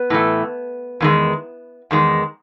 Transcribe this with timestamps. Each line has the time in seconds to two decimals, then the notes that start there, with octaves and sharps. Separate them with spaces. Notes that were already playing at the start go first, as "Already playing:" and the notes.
Already playing: B3
0.10 A2 E3 A3
1.00 E2 D#3 G#3
1.91 E2 D#3 G#3